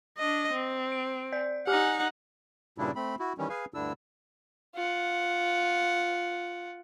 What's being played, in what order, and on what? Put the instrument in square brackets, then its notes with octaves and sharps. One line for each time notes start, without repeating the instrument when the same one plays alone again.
[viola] D4 D#5
C4
[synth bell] D7
D5 G6
[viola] D#4 F#5 [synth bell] G4 G#5 F6
[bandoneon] G2 A#2 C#3 G3 D4 E4
A3 C4 B5
E4 F#4
D#3 E3 G3 C#4
G#4 B4 F5 G#5
D2 G2 D3 D4 E4 E6
[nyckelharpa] F4 F#5